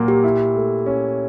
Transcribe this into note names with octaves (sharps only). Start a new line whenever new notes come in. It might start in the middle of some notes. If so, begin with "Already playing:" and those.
Already playing: A#2 F#3 A#3
G4
E4
A3
C#4